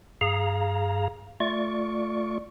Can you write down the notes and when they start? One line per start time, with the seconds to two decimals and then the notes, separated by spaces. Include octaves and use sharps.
0.21 G2 G#4 F5 A#5
1.40 A3 F4 D5 C#6